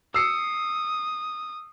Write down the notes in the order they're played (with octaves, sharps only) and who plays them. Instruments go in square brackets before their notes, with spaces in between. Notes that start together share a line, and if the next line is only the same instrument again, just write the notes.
[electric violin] D#6 [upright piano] E6 C7 C#7